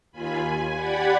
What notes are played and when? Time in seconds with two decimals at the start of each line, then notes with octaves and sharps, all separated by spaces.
0.12 D#2 F4 G#5 B5
0.42 G#5
0.74 G4 D5 F#5 B5 G#6